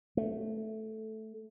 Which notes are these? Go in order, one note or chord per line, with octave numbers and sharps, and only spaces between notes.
A3